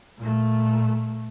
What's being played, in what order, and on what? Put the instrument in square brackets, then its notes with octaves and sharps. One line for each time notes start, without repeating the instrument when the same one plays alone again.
[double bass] A#2 A3